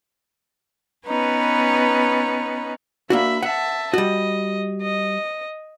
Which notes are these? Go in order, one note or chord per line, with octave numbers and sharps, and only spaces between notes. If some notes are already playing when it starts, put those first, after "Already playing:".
B3 C#4 D#4 B4
A#3 D4 F#4 E5 B5
E5 F#5 A5
G3 F#4 D#5
D#5